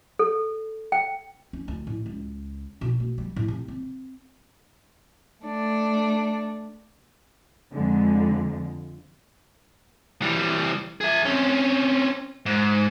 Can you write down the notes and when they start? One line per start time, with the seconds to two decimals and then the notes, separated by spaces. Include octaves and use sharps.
0.19 A4
0.92 G5
1.53 C#4
1.68 D2
1.87 A2
2.06 C#2
2.81 B2
3.00 A#3
3.18 G3
3.36 A2
3.48 C3
3.68 C4
5.42 A3 D4
7.71 F2 D3 G#3
10.22 E3 G3
11.01 G#4 E5
11.25 C4 C#4
12.46 G#2